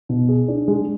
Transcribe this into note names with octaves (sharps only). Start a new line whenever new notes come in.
B2
G#4
D4
G#3